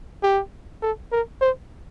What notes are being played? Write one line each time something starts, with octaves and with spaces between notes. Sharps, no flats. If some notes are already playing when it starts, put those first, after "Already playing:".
G4
A4
A#4
C5